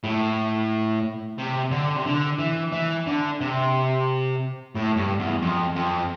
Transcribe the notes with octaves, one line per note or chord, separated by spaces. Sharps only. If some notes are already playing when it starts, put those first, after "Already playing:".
A2
C3
D3
C3
D3
E3
E3
D3
C3
A2
G2
E2
F2
F2